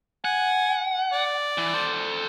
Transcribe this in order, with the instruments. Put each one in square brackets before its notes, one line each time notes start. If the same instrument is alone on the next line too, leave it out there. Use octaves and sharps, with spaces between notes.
[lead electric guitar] F#5 [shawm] G#5
[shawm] D5
[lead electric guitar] E3
A4 C5